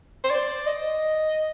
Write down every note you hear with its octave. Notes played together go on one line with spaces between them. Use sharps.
C5
D5
D#5